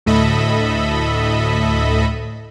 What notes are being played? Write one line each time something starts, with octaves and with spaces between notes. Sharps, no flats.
D2 A2 A4 D#5 E5 B5